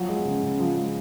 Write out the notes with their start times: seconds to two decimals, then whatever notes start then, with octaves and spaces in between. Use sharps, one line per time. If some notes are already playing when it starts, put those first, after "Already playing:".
Already playing: F3 F#3
0.09 G#3
0.25 C#3
0.43 C#3
0.59 F3
0.77 G#3